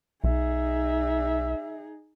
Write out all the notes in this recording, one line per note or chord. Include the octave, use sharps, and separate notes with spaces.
B1 D#4 G#4 E5